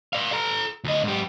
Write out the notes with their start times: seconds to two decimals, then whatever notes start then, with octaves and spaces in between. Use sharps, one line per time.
0.13 D5 F5
0.33 A4 A#5
0.84 D2 D#5
1.04 G#2 G4